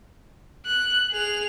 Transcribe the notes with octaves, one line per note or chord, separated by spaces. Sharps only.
F#6
G#4 F7